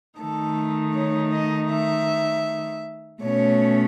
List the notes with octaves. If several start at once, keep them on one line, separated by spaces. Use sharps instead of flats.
D#3 A3 D#4 A4
C#5
D#5
E5
B2 A3 C#4 C#5